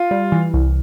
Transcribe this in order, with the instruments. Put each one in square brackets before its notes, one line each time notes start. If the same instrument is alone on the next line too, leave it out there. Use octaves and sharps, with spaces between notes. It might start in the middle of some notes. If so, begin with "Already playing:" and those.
Already playing: [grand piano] F4
[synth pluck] G3
E3
C2